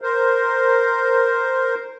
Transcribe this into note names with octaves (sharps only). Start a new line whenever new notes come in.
A#4 C5